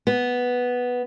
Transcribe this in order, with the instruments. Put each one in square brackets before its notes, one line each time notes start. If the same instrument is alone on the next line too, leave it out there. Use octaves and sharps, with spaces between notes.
[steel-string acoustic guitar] B3